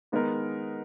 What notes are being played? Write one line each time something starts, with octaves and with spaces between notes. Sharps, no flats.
D#3 G#3 B3 D#4 A#4